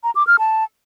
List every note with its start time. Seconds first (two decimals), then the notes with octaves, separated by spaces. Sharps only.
0.04 A#5
0.15 D6
0.27 F6
0.39 A5